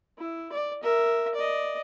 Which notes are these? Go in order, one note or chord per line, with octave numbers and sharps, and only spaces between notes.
E4
D5
A#4 E5
D5 D#5